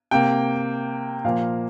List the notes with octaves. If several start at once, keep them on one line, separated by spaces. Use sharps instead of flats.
C3 A#3 G5
A#2 F3 A#3 F5